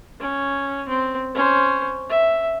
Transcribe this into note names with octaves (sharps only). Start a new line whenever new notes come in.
C#4
C4
C#4 C5
E5